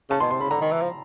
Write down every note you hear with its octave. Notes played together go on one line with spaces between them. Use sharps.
C#3 A5
B2 C6
C3 C6
C#3 B5
D3 A#5
D#3
E3
F3